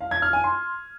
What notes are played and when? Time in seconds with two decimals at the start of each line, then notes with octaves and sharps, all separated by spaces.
0.01 F5
0.11 G#6
0.22 F6
0.33 G#5
0.44 C6